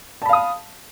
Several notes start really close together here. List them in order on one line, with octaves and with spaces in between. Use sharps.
A5 B5 F5 D#6